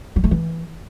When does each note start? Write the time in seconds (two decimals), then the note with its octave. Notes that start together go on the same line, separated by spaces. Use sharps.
0.16 G3
0.24 A3
0.31 E3